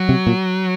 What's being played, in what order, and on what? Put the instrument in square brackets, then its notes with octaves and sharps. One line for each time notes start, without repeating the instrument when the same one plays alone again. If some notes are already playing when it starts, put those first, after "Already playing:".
Already playing: [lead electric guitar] F#3
[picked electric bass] C3
A#2